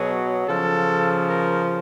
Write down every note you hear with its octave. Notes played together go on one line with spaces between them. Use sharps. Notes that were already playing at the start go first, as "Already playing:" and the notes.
Already playing: B2 F#3 G#4
C#3 F3 A4
A#4